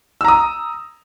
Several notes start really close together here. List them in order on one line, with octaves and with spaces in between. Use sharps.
E6 A#5 D#6